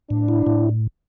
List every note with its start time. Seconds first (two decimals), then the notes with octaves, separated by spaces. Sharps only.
0.10 A2 D4
0.28 E4
0.47 A2